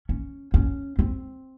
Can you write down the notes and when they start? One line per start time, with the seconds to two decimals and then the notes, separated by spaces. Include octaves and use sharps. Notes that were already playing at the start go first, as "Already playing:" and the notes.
0.09 C#4
0.54 C#4
0.99 C4